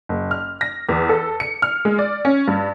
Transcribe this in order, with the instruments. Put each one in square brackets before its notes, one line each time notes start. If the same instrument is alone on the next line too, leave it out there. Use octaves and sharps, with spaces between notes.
[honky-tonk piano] F#1
F6
A#6
E2
A4
C#7
F6
G#3
D5
C#4
G2